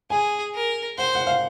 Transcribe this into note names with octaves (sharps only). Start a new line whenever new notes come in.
G#4 G#5
A#4
C5 F#5
F#5
F5